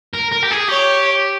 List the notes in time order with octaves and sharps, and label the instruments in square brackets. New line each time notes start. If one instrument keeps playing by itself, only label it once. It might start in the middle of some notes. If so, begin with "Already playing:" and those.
[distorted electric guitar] A#4
A#4
G4
G#4
[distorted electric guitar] G4 [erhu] C#5